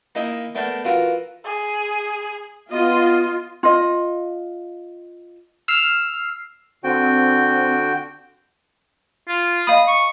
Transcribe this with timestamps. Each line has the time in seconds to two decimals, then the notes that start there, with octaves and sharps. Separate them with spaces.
0.15 A#3 D#4 E4 D#5 E5 G#5
0.55 A3 B3 D4 A#4 G5 A5
0.85 E3 F4 F#4 A#4
1.45 G#4
2.71 B3 F4 D#5
3.63 F4 D#5
5.68 E6 F6 C7
6.84 D3 C4 F#4 G5
9.28 F4
9.67 D#5 F5 B5 D#6
9.88 C#6